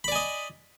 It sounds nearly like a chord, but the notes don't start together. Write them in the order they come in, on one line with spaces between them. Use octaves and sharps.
B5 D5 G#5 D#5